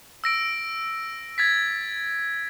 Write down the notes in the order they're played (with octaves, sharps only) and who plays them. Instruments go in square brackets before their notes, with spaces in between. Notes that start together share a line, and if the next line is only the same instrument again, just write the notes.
[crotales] E6 A#6 D7
G#6 A6 B6